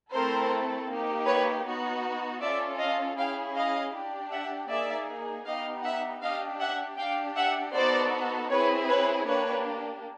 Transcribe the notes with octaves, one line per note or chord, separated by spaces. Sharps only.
A3 C4 E4 A4 A#4 C5
A#3 D#4 G4
B4 C#5
B3 D#4 F#4
C#4 F4 A4 D5 E5
D#5 F5
C#4 E4 G#4 F5 G5
D#5 F5
D4 G4
E5 F#5
A#3 D#4 G#4 D5 E5
B3 D#4 G4 D#5 F5
E5 F#5
D4 G4 D#5 F5
E5 F#5
D4 G4 F5 G5
E5 F#5
B3 D#4 F#4 A4 C5 D5
C4 E4 G#4 B4 C#5
B4 C#5
A#3 D4 G4 B4 C#5